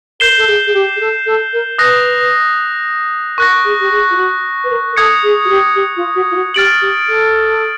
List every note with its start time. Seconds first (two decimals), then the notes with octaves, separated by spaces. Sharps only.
0.20 A#4 G6 C7 E7 G7
0.37 A4
0.47 G#4
0.66 G#4
0.73 G4
0.96 G#4
1.00 A4
1.26 A4
1.53 A#4
1.78 B4 D#6 F#6 A#6
3.37 A#4 C#6 F#6 A#6
3.64 G#4
3.80 G4
3.91 G#4
4.10 F4
4.17 F#4
4.64 B4
4.70 A#4
4.92 A#4
4.96 A4 D#6 G#6 C#7
5.23 G#4
5.44 F#4
5.49 G4
5.75 G4
5.96 F4
6.15 F#4
6.31 F4
6.35 F#4
6.54 G4 F6 A6 D7 F#7
6.81 G4
7.08 A4